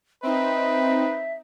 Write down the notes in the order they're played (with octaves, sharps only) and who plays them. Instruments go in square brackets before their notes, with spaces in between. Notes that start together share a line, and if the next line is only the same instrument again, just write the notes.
[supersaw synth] C4 D#4 [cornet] B4 [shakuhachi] E5